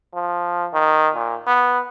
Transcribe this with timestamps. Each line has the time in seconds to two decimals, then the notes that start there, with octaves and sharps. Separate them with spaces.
0.14 F3
0.74 D#3
1.15 A#2
1.47 B3